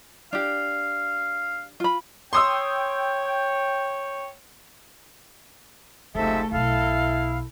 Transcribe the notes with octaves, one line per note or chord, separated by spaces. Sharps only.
D4 G4 F5
F4 B5
C#5 G5 C6 D#6 E6
F#1 C2 G#2 C3 F3 A3 A4 E5
B1 B2 E4 A4 F5